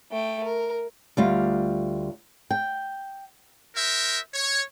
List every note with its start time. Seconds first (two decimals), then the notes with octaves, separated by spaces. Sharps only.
0.12 A3 G5
0.44 A#4
1.17 D2 G3 F4
2.51 G5
3.76 F#4 A#4 C5 E5
4.34 C#5